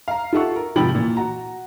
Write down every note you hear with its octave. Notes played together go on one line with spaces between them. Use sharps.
F5 A#5
F4 G4 A4 E5 F#5 C#6
A#4
G#1 C3 F3 G5 B5 F#7
A#2 E3
F#4 A#5